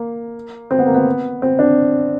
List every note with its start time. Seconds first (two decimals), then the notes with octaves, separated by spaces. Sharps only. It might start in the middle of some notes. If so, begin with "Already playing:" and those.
Already playing: A#3
0.71 C4
0.79 B3
0.86 A#3
0.94 B3
1.42 C4
1.59 D4